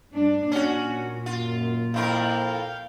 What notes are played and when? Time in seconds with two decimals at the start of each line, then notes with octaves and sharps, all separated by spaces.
0.13 G2 D4
0.52 A#2 C#4 F#4
1.26 F#2 F4
1.94 F2 E4 A#4 F5 G5